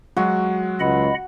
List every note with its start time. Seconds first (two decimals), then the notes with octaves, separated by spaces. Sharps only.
0.17 F#3 G#3 F#4
0.80 C#2 D#5 F#5 B5